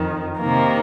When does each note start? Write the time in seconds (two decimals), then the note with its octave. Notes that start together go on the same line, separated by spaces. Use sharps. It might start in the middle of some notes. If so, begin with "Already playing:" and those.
Already playing: F2 D#3
0.39 C3 D#3 A#3